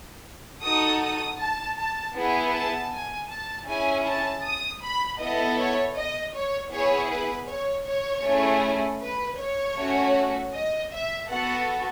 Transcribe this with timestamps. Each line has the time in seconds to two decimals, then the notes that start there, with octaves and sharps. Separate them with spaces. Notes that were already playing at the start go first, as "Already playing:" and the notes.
0.61 D#4 F#4 A4 D#6
1.01 D#6
1.38 A5
1.77 A5
2.14 B3 E4 G#4
2.52 A5
2.91 G#5
3.29 A5
3.66 C#4 E4 G#4 G#5
4.05 A5
4.44 D#6
4.82 B5
5.19 B3 E4 A4 D#5
5.58 C#5
5.96 D#5
6.34 C#5
6.72 B3 E4 G#4 C#5
7.10 B4
7.48 C#5
7.86 C#5
8.24 A3 C#4 E4 G#4
9.01 B4
9.38 C#5
9.76 A3 C#4 F#4
10.54 D#5
10.92 E5
11.29 B3 F#4 A4 F#5